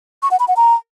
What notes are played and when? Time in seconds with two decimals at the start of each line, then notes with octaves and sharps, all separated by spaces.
0.23 C#6
0.31 F#5
0.40 B5
0.48 F#5
0.57 A#5